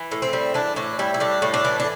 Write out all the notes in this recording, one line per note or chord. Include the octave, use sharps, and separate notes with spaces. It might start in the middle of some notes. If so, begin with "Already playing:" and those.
Already playing: E3
A2
C4
G3
E3 D4
A2 D4
G3 E4
E4
A2 D4
A2
D4
E3
D4